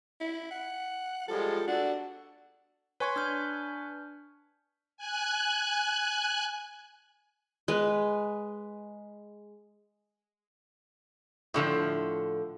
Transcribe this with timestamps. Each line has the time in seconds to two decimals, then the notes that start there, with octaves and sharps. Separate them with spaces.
0.21 E4
0.51 F#5
1.28 F3 G3 G#3 A4
1.68 D4 F#4 A4 F#5
3.00 B4 C#5 G#5 C6 C#6 G#6
3.16 D4 F6 G6
4.97 G#5 F#6
7.68 G#3 B4
11.54 A2 D3 F3